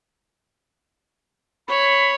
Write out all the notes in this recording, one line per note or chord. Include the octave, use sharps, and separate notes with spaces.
C#5 B5